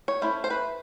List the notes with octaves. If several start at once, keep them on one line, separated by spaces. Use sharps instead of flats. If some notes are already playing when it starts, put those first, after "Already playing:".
C#5
A3 C#4 E4 C5
C5
B4